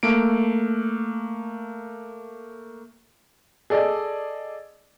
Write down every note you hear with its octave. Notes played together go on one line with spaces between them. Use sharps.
A3 A#3 D7
G#4 A4 D5 D#5